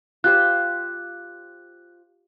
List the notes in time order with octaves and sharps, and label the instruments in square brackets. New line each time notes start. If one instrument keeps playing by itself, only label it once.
[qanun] F4 G4 C5 [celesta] F#6